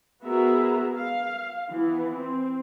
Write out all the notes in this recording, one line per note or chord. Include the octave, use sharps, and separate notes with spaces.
B3 F#4 G#4 A#4 E5 A#5
F5
E3 B3
C4